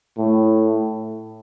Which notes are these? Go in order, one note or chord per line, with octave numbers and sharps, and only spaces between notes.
A2